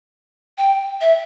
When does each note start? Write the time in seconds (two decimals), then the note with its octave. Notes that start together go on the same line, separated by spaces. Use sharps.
0.58 G5
1.01 E5